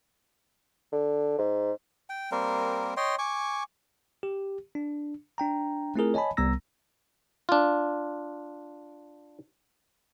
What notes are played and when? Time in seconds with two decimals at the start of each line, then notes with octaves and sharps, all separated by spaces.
0.92 D3
1.38 G#2
2.10 G5
2.32 G3 A#3 C4 A#4
2.97 C#5 D#5 G5 C6
3.19 G#5 C#6 D6
4.23 G4
4.75 D4
5.38 D4 G5 A#5
5.96 A3 C4 E4 F4 G#4 A#4
6.14 C#5 D#5 G#5 A5 B5
6.37 C2 G3 B3 A#5 E6 A#6
7.49 D4 F4